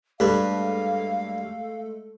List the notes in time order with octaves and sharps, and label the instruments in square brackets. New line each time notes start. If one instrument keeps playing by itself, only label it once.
[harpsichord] G2 B4 [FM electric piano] G#3 A3 A4 [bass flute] F5